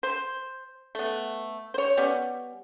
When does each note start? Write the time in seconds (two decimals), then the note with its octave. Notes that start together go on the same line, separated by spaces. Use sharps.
0.03 C5
0.95 A3 B3
1.74 C5 C#5
1.97 G3 B3 C#4